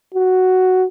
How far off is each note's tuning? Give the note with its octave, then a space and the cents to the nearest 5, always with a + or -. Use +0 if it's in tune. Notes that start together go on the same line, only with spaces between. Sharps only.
F#4 +5